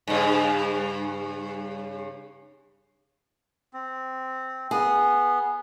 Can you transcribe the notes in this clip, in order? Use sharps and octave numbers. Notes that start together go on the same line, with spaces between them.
G2 C#3
C4
B3 G#4